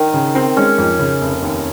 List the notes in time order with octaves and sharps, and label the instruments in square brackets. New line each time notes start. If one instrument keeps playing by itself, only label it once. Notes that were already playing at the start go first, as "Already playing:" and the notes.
Already playing: [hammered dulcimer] D#3
[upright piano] C#3
C4
[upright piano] G#3 [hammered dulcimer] C#4
[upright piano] F2
C#3
F1
D#2